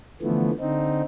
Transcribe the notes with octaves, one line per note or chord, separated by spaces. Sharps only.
D3 E3 F3 A3 B3
D3 C4 D#4